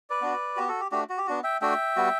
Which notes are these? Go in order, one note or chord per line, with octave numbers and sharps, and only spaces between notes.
B4 D5
B3 D4 F#4
B3 F#4 G4
F#4 A4
G4
A3 D4 F#4 G4
F#4
G4
B3 D4 F#4
E5 G5
A3 D4 F#4 E5 G5
G3 B3 F#4